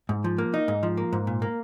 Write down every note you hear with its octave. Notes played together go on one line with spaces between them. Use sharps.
G#2
F3
A#3
D#4
G#2
F3
A#3
G#2
A#2
A#3